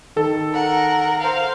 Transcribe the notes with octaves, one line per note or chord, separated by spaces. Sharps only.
D#3 A4
A#4 F#5
C5 F5